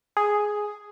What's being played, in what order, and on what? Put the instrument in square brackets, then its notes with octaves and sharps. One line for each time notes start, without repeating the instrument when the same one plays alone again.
[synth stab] G#4